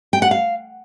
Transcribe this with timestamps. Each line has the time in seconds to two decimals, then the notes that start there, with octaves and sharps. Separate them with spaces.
0.13 G5
0.22 F#5
0.31 F5